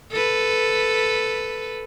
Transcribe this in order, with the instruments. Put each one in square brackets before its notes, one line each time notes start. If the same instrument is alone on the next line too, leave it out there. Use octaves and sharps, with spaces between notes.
[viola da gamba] A4 B4